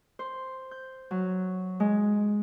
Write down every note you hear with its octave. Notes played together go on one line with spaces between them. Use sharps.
C5
G6
F#3
G#3